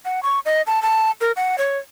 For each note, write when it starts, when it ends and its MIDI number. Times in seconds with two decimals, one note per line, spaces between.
0.05 0.23 78
0.23 0.40 85
0.45 0.62 75
0.67 0.82 81
0.82 1.11 81
1.21 1.32 70
1.36 1.56 78
1.58 1.78 73